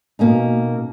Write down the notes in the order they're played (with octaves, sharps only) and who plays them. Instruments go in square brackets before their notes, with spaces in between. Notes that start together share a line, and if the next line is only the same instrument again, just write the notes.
[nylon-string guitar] B2 A#3 C#4 D#4